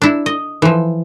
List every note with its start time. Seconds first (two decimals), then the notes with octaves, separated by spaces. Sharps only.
0.02 D4 E4
0.26 D#5
0.62 E3 F3